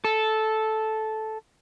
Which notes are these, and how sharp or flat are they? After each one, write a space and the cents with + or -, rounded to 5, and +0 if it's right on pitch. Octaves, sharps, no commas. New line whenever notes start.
A4 -10